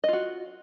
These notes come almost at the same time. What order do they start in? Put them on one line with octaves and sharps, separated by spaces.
D#5 F4 F#4